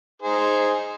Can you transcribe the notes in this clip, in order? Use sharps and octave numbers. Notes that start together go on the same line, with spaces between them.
D#4 G#4 C5